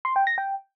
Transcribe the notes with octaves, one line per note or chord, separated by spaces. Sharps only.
C6
G5
A#6
G5